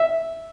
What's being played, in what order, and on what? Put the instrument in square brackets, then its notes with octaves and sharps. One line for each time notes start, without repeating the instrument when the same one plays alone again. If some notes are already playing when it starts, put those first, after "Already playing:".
Already playing: [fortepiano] E5